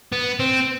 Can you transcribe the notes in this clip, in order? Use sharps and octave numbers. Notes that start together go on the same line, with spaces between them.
B3
C4